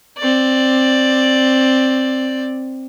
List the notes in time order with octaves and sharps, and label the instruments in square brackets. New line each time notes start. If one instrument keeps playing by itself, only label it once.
[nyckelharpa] C4 D5